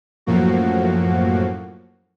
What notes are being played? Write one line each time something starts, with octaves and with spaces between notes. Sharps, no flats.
F#2 A2 F3 A#3 F#4